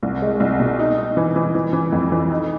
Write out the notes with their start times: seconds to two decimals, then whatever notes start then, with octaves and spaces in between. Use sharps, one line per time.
0.03 C2
0.22 G#3
0.40 C2
0.60 B2
0.79 D#4
0.98 D#4
1.17 E3
1.36 E3
1.55 E3
1.73 E3
1.92 F2
2.12 E3
2.31 D#4